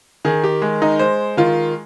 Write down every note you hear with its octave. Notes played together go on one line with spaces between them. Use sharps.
D#3 G#4
G4
G#3
D#4
G#3 C5
D#3 F4